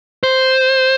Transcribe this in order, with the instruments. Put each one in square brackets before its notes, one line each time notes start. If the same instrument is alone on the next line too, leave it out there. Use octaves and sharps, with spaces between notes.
[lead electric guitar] C5